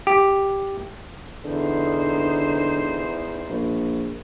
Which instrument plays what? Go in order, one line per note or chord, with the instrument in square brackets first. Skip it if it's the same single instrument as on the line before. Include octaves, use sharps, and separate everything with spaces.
[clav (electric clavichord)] G4
[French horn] E2 [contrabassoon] D3 [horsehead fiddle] D#4 C5
[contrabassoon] A#1